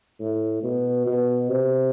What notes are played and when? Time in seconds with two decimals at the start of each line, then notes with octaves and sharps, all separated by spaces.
0.20 A2
0.63 B2
1.07 B2
1.49 C3